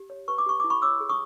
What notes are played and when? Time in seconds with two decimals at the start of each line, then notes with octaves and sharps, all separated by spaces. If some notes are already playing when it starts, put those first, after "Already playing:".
Already playing: G4
0.10 C#5
0.28 B4 C#6
0.38 D6
0.46 G4 C#6
0.60 E4 D6
0.70 B5 C#6
0.82 C#5 D6 E6
1.00 G#4
1.09 C#6 D#6